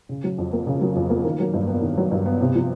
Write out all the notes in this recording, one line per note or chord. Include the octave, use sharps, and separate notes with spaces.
C#3
F#3
F2
A#3
C#3
F#3
F2
A#3
D#3
F#3
G2
B3
D#3
F#3
G2
B3
C3
F3